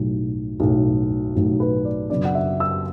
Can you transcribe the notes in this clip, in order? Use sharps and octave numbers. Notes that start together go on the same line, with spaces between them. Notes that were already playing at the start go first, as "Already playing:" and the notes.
Already playing: B1 A2 F#3
B1 A2 F#3
B1 A2 F#3
B4
D5
F#1 F#2 F#3 B3 D4 D5
F#5
E5
E6